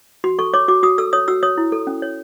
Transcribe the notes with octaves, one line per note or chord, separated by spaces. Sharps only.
F#4 C6
A4 C#6
C#5 D6
F#4 D6
F#4 D#6
A4 E6
C#5 D#6
F#4 E6
C#5 D#6
E4
A4
C#4
C#5